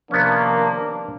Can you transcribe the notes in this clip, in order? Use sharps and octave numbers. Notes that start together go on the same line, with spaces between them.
C3 D#3 F3 A#3 B3 C#4 D4